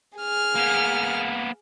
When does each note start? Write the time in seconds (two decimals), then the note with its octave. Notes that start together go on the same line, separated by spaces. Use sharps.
0.18 G#4 F6
0.56 A#3 B3